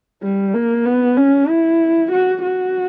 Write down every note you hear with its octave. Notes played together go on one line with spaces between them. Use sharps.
G3
A#3
B3
C#4
E4
F#4
F#4